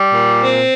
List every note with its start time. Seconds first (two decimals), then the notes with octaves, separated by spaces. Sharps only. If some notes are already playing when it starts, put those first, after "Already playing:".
Already playing: G3
0.13 A#2
0.41 C4